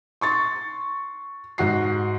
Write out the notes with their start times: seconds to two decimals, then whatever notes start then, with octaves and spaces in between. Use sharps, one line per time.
0.21 C6 C#6 A6
1.58 G#2 F#4 C7